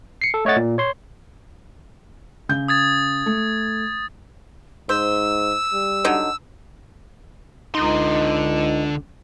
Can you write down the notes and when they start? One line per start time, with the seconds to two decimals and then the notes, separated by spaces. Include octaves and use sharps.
0.22 C7 C#7
0.34 A4
0.45 A3 C#5 D#5 F#5 A6
0.56 A#2
0.78 C#5 C6
2.49 C#3 G6
2.68 D#6 G#6 A6
3.26 A3
4.89 G#2 C5 E6
5.73 G3
6.04 D3 F#3 D#4
7.75 C#2 D3 D#4 C6